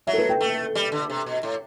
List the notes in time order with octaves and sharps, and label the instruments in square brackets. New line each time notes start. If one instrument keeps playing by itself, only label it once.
[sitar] F#3 [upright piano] E5
[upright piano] A4
B4
G5
[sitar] A3
G3
D3
C3
B2
A2